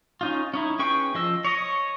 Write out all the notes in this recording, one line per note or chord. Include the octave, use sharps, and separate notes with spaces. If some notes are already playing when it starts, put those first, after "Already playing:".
C#4 D#4 F4
C#4 D#4 E4
C#4 G#4 B4 G5 C#6
F3 D#5 E6
C#5 D#5